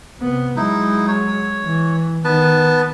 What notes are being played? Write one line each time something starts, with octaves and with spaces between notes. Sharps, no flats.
C3 B3
F#3 G#3 D#4 E4
C#5
E3
D#3 B3 B4 A5